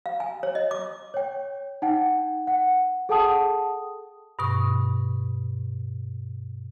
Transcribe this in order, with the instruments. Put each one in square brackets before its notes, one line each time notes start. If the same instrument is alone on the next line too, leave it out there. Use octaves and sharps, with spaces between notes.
[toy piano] F5
G#5
C#5
D#5
D6
[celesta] C#5 G5
D#4 F#5 G5
F#5
G#4 A4 F#5 G5 A5 D#6
[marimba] G2 B2 C#6